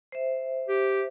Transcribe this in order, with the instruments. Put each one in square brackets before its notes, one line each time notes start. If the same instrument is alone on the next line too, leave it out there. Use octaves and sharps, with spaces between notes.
[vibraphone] C5 E5
[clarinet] G4